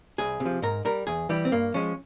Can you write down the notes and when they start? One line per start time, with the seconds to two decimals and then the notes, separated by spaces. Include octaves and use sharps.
0.18 C2 G#4
0.40 C3
0.46 F3
0.62 G#2 A#4
0.85 G3 A#4
1.07 E2 G#4
1.29 E3 G3 G4
1.45 C4
1.51 G2 A#3
1.74 F3 G#3 C#4